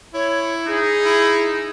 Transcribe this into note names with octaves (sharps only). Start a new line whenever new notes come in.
E4 C#5
D#4 G#4
E4